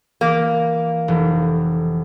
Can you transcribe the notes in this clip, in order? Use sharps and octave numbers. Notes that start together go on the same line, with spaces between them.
E3 A#3
F1 E3